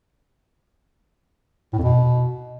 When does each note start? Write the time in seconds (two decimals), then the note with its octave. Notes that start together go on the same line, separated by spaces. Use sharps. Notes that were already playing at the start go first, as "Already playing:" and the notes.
1.73 A2
1.78 F2
1.83 B2